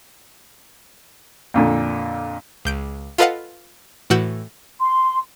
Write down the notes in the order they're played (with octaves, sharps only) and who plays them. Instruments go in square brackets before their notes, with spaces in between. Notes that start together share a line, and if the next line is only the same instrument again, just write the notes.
[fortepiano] F2 A#2 D3
[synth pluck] C#2 G6 D7
F4 A4 B4 D#5 F5 F#5
A2 E3 F#4 F#5 E6 G6
[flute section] C6